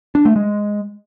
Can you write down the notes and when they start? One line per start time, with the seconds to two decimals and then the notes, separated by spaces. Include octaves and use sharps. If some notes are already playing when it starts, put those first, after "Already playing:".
0.15 D4
0.25 A3
0.36 G#3